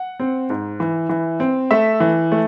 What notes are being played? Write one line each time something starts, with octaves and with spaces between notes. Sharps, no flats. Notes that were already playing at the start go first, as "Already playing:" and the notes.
Already playing: F#5
C4
G#2
E3
E3
C4
A3 E5
E3
A3